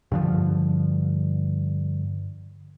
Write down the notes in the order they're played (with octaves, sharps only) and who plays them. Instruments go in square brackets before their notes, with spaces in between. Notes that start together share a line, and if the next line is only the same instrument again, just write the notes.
[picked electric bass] G2 D3 F3